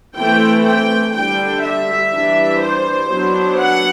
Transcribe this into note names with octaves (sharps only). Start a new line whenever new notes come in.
E3 A3 C4 G5
G5
D3 G3 D4 G5
E5
E3 G3 D4
C5
F#3 B3 D4
F#5